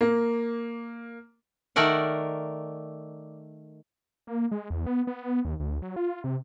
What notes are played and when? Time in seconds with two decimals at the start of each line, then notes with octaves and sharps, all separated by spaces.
0.01 A#3
1.76 D#3 A3 A#4 D5 F#5
4.27 A#3
4.51 G#3
4.70 E2
4.87 B3
5.07 B3
5.45 D#2
5.60 D2
5.82 F#3
5.96 F4
6.24 C3